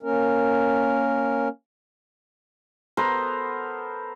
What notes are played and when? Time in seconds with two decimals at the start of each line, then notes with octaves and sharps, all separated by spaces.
0.03 A#3 C#4 A#4
2.97 B3 A4 A#4 C5